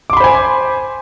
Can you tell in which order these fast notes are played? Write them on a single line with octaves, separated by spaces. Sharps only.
D6 C6 B5 C5 G#5